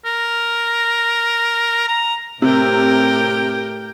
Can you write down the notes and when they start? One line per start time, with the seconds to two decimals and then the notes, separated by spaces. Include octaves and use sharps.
0.05 A#4
1.88 A#5
2.42 A2 C3 G4 A#4 G5